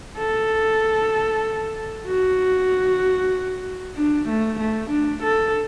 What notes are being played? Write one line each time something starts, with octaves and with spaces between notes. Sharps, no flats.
A4
F#4
D4
A3
A3
D4
A4